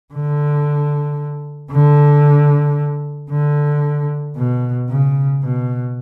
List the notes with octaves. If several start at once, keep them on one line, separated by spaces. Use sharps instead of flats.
D3
D3
D3
B2
C#3
B2